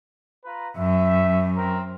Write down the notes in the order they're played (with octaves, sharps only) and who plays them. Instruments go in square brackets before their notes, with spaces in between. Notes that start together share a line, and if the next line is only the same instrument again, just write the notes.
[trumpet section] F4 B4 A#5
[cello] F#2 [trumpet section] E5
[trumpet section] C4 A#4